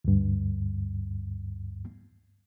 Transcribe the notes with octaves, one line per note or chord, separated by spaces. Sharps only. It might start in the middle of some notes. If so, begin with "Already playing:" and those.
D2 G2